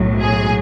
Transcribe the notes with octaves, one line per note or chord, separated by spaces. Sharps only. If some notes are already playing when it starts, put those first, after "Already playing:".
Already playing: B1 A2 F#3
G#4